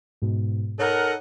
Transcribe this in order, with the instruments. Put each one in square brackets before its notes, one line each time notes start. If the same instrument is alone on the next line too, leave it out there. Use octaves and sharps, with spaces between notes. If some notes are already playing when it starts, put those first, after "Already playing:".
[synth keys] G#2 B2
[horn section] D#4 A4 F#5 [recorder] A#4 [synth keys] C#5